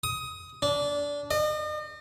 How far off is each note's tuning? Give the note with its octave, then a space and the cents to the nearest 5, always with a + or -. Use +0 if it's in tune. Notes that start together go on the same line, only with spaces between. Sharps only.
D#6 +15
D4 -20
D#5 -40